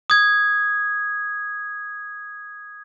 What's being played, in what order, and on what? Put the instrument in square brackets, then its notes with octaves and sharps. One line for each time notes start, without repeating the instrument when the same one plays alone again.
[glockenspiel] D#6 G#6